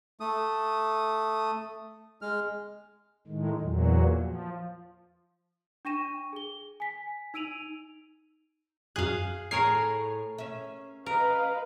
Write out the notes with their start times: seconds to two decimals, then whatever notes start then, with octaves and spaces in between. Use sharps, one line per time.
0.20 A3 D#6
2.22 G#3 F6
3.27 A2 D#3 G#3
3.60 E2 A#2 F#3
4.17 F3
5.85 D4 G5 C#6 A#6 D#7 E7
6.33 G#4 G7
6.80 G#5 B6
7.34 D#4 E6 D7 D#7 F7 F#7
8.96 F#2 G#4 F5 F#6
9.51 A2 G#4 A#4 C#5 C7
10.38 C#4 E5
11.06 A#4 B4 D#5 F5